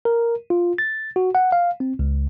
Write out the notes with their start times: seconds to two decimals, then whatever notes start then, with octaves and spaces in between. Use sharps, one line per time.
0.05 A#4
0.50 F4
0.78 A6
1.16 F#4
1.35 F#5
1.52 F5
1.80 C4
1.99 C#2